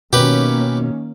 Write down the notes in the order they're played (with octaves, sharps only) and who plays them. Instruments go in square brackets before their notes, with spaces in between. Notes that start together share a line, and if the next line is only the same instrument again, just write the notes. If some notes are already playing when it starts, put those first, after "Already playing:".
[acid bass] B2 [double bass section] D#3 A#3 C#4 [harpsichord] G4 B4